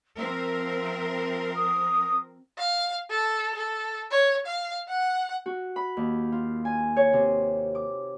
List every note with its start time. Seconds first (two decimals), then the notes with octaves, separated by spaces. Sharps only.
0.17 F3 C4 A#4 E5
1.54 D#6
2.58 F5
3.10 A4
3.55 A4
4.11 C#5
4.46 F5
4.89 F#5
5.46 F#4
5.76 B5
5.97 D#2
6.32 F4
6.65 G#5
6.96 C#5
7.13 C3
7.75 D6